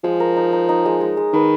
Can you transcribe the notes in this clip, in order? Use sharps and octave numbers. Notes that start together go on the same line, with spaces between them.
F3 G#3
A#4
D#4
D#4
D#4
G#3
G#3
G#3
D#3 B4